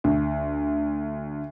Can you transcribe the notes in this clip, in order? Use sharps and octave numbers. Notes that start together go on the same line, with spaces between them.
D2